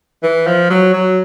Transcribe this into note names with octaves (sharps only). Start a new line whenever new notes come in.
E3
F3
F#3
F#3